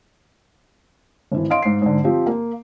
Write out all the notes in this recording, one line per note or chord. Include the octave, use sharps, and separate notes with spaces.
G#1 E3
D#5 F5 C6 D7
G#2 F5 C7
G#2 D3
F3 C4 G4
A#3